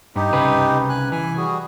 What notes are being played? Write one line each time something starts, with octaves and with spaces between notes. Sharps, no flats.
G2 D#4 G4
C2 C#3 B4
G#5 F#6
E3 G#5
G3 F#4 G#4